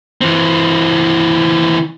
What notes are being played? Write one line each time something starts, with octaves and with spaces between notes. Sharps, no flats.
E3 C4